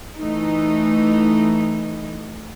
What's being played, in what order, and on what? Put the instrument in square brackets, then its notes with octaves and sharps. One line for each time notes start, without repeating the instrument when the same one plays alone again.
[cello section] E3 A3 D#4